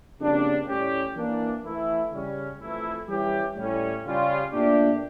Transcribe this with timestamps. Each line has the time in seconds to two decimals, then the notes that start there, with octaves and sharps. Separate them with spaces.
0.19 F2 C#3 G3 A#3 D4
0.67 A2 G3 C#4 G4
1.15 E3 A#3 D4
1.64 E3 A3 E4
2.11 C#3 G3 C#4
2.60 F2 E3 A3 E4
3.08 E3 G3 C#4 E4 G4
3.57 A2 G3 C#4
4.04 C#3 G3 C#4 F4
4.53 A#2 A3 D4 G4